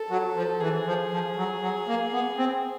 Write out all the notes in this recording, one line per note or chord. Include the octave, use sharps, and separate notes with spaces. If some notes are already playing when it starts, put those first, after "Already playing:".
Already playing: A4
F#3
F3
E3 G#4
F3
F3
F#3
F#3
A#3
B3
C4